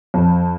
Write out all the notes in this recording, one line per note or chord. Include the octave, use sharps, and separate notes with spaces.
F2